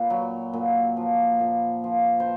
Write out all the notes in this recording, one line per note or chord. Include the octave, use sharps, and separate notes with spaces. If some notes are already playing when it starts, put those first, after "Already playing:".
Already playing: A#2 B4
F#3
A#2
F3
A#2
F3
C5